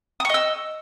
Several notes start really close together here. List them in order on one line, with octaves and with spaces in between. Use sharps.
D#6 C#6 D#5 E6